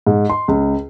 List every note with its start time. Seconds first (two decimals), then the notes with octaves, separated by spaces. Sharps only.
0.07 G#2
0.30 C6
0.48 C#2